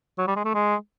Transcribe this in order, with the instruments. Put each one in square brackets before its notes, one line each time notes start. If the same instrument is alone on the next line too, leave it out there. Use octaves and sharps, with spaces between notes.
[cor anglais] F#3
G3
G#3
A3
G#3